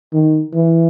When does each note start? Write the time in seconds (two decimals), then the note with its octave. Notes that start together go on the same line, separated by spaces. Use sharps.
0.13 D#3
0.54 E3